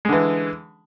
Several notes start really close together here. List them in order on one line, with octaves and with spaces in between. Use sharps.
G#3 D3 E3